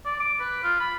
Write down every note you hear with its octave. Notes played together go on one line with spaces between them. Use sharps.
D5
D6
B4
F4
B5